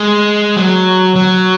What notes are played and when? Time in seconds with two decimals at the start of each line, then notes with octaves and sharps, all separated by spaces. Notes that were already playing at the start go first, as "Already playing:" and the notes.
Already playing: G#3
0.56 F#3
1.16 F#3